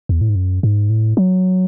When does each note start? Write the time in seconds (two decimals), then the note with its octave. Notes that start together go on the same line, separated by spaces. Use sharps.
0.09 E2
0.21 A2
0.29 G#2
0.36 F#2
0.63 G#2
0.90 A2
1.17 F#3